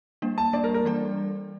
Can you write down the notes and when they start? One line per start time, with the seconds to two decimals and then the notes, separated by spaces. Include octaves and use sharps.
0.22 G3 A#3 D4
0.38 A5
0.53 G3 A#3 D4 D5
0.64 A#4
0.74 A#4
0.85 E3 G3 D4 A4 D5